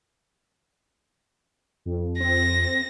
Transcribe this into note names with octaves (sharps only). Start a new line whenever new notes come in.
F2
C4 A#6